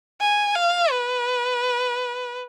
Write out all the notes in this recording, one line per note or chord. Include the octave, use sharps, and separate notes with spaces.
G#5
F5
B4